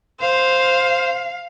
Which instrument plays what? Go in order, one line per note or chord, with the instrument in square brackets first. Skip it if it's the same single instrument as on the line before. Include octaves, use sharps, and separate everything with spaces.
[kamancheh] C5 [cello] F5